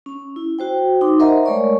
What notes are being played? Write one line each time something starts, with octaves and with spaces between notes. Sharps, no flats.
C#4
E4
F#4 C5 G5
D#4 C6 D6
A#4 C5 D#5 E5 F#5 A#5
G#3 A3 A#4 C#5 D5 C#6